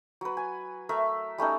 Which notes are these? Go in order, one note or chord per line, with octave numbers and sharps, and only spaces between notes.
F#3 B4
G#5
A3 A#4 E5
G3 A3 C#4 D#4